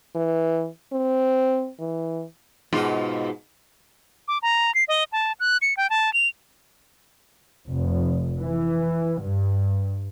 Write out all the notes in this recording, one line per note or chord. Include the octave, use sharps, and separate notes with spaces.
E3
C4
E3
G#2 B2 F4
D6
A#5
C7
D#5
A5
F#6
C#7
G5
A5
F7
F1
E3
G2